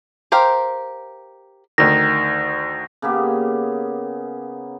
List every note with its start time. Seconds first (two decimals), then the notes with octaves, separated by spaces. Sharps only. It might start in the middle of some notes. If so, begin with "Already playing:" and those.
0.32 G4 A#4 C5 F5
1.78 D2 D#3 A#6
3.02 C#3 A#3 B3 G4